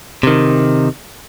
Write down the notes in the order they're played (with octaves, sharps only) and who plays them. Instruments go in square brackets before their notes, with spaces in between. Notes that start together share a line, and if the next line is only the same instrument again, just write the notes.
[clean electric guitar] C3 D#3